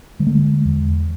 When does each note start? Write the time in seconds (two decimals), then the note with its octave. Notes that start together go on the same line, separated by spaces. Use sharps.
0.19 D3 G#3
0.26 A3
0.35 G#3
0.65 E2